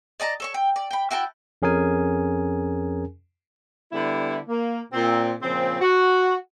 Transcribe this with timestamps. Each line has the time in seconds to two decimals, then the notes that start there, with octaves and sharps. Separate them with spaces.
0.20 D5 D#5 A5 A#5
0.40 A4 C#5 C#6
0.54 G5
0.76 D5
0.91 G5 B5
1.11 E4 F#4 G5 A5
1.62 F2 C#4 G#4 A#4 G#5
3.92 D3 G3 B3 E4
4.48 A#3
4.93 A#2 C4
5.42 A#2 C#3 F3 C4
5.80 F#4